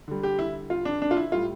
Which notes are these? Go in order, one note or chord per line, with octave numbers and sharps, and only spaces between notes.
D3 G3
G4
E4
F4
D4
D4
F4
E4
A2 G3 F4